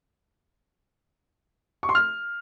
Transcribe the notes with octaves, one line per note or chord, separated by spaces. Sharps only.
C#6
C6
F6